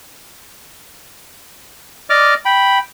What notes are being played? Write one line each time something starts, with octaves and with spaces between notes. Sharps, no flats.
D5 D#5 D6 F6
G5 B5